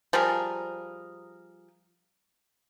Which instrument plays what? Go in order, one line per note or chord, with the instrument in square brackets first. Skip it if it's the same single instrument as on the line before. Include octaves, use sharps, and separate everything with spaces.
[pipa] F3 G3 G#4 A#4